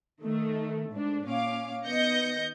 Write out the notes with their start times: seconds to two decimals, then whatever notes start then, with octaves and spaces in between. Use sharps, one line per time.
0.22 D#3 A3
0.91 G#2 D4
1.26 A#2 C#4 F5 D6
1.87 D#3 B3 D#5 G6 A#6 C#7